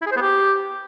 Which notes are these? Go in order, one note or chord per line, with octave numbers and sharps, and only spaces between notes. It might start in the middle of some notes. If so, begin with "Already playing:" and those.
E4
G#4
C5
B3
G4